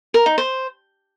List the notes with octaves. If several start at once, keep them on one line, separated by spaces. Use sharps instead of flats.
A#4
D#4
C5